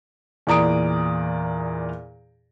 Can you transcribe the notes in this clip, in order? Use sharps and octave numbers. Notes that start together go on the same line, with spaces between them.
E2 A#2 D5 A#5 D#6 D7